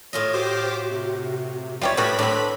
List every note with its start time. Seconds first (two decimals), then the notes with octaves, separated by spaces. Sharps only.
0.13 A2 F4 C#5 D#5
0.33 F#4 G4 C5 D6
0.90 C3
1.81 B1 G3 F4 G4 C#5 E5 A6
1.97 A2 F3 G3 F#4 B4 B5 B6
2.19 A2 C4 D4